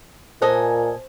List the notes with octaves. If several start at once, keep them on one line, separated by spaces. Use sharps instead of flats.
A#2 A4 C5 D#5 G#5